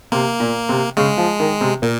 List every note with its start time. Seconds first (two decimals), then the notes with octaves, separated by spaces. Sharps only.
0.12 C3 A#3
0.40 A#2
0.69 C3
0.97 C#3 G#3
1.18 F3
1.40 D#3
1.61 C3
1.82 A#2 A#3